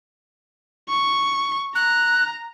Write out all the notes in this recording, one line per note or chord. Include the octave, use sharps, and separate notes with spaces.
C#6
A#5 F#6